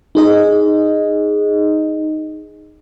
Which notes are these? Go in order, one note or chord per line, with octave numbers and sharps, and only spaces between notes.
D#4 G#4 D#5